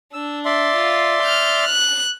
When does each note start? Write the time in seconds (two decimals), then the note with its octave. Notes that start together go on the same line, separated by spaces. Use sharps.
0.13 D4 E6
0.45 D5 E5 C6
0.75 F4
1.22 F6 G6
1.66 F#6